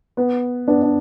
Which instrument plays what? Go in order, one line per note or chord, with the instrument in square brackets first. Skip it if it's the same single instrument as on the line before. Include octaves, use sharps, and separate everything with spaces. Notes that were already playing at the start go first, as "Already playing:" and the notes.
[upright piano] B3
B3 D4
D4